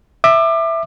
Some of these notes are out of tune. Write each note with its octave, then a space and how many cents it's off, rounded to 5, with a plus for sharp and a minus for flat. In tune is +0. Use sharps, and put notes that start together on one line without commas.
E5 +0 D6 +30